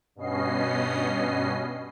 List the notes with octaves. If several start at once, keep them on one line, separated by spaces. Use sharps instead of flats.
G2 B2 B3 C#4 D#5 C7